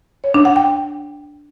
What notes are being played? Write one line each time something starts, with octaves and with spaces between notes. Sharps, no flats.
C#5
D4
F#5
G5